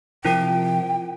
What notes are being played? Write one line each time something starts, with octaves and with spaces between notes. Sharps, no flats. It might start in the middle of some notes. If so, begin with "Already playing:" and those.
C3 F3 E4 F4 A#4 G5 A5